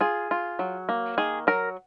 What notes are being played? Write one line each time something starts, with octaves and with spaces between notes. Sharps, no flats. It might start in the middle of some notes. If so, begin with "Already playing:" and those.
F4 G#4
F4
F#3
A#3
D#3 G#4
F#3 A#4